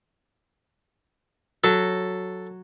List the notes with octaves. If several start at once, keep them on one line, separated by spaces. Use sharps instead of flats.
F#3 A4